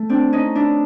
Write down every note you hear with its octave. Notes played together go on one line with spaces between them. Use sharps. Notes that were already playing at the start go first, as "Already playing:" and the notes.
Already playing: A3
C4 D4
C#4 D#4
D4 E4